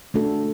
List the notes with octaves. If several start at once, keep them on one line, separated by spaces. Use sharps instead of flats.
A3 D4 F#4 A4